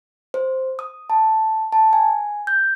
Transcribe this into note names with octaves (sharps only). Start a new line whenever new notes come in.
C5
D#6
A5
A5
G#5
G6